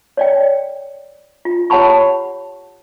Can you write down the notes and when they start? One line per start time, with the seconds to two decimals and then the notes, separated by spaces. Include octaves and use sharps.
0.17 C#5 D5 G5
1.45 F4
1.70 G4 C#5 F#5 A5 B5 C#6